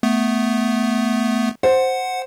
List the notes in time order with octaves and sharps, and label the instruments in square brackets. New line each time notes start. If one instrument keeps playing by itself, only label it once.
[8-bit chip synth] A3 B3
[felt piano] C5 [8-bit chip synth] F#5